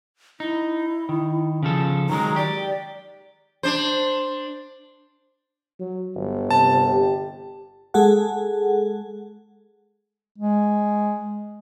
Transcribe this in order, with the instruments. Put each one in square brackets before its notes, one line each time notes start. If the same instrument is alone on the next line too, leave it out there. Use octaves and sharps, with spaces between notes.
[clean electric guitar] D#4 [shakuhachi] E4
[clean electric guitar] D#3
C#3 F3 A4
[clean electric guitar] D#3 F#3 G#3 [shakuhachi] A#5
[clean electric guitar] G4 [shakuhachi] D5
[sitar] D4 C5
[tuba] F#3
G1
[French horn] C3 [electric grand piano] A5
[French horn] G4
[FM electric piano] G#3 G#4 A4 F#5
[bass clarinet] G#3